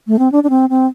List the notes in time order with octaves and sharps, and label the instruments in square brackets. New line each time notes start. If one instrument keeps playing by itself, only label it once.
[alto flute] A3
C4
D4
D4
C4
C4